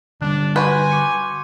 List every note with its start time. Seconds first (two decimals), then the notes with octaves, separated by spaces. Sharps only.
0.22 D3 G3 D4 F#6
0.56 F#4 B4 G#5 C6 G6 D#7
0.91 C#6 D6 C#7